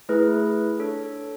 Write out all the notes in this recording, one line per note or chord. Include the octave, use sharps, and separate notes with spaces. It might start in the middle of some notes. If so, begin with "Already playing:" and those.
A3 E4 G#4 B4
D4 A4 C#5